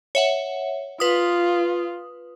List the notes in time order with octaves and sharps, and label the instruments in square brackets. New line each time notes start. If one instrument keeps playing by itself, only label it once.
[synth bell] C#5 E5 F#5
[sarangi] F4 [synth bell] B4 D#6